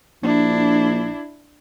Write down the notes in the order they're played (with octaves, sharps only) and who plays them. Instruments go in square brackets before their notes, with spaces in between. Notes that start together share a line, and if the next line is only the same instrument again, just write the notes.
[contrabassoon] A#1 [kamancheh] D4 E4